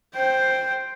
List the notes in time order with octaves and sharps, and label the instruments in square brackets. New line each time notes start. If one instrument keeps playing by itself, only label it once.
[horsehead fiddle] C5 G5